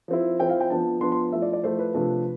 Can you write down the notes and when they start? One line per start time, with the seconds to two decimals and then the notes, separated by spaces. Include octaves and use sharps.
0.08 F3 C4 E4
0.39 F3 C4 E4 G5
0.50 F5
0.60 G5
0.70 F3 B3 D4 A5
1.01 F3 B3 D4 C6
1.12 C6
1.33 F3 A3 E4 E5
1.42 D5
1.53 D5
1.63 F3 A3 E4 C5
1.79 B4
1.94 C3 F3 A3 D4